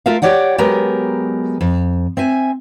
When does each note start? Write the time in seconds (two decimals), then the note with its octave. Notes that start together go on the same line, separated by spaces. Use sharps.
0.06 A3 F4 A#4 E5 F5
0.22 G4 C#5 D5 F#5 G5
0.58 F#3 G#3 B3 G4 A#4
1.61 F2
2.17 C4 E5 G#5